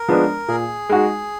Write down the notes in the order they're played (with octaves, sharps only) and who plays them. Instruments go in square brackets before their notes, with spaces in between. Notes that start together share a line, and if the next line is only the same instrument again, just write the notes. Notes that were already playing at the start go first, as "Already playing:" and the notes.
Already playing: [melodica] A#4
[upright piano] F3 G#3 B3 D4
[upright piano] A#2 [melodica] G#4
[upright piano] G#3 D#4 F#4